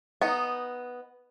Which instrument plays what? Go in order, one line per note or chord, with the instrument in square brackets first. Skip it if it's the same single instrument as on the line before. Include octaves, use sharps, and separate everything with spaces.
[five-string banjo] B3 D#4